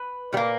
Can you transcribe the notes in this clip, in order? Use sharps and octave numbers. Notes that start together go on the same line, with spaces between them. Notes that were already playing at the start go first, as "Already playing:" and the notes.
Already playing: B4
A#2 G3 A#3